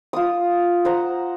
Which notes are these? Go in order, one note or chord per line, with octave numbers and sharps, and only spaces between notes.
F4 D#6
C5 F#5 A#5